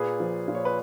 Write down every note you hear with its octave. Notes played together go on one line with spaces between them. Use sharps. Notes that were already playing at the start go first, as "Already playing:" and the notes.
Already playing: A#2 G#4 B4
F3
A#2
C#5
B4